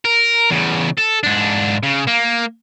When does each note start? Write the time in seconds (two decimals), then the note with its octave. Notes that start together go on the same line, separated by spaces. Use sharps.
0.05 A#4
0.50 E2 C#3
0.98 A4
1.23 G#2 D4
1.83 C#3
2.07 A#3